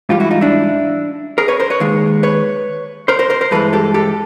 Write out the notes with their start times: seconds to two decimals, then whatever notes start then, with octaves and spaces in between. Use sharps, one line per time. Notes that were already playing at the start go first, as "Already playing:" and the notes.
0.09 G#2 E3 G3 F4 G4
0.20 E4 F#4
0.31 D#4 F4
0.41 D4 E4
1.38 G#4 A#4
1.48 B4 C#5
1.60 A#4 C5
1.70 B4 C#5
1.80 D#2 D#3 G#3
2.23 B4 C#5
3.08 A#4 C5
3.19 A#4 C5
3.30 A#4 C5
3.41 A#4 C5
3.51 G2 E3 G#3 A4 B4
3.73 G4 A4
3.94 G4 A4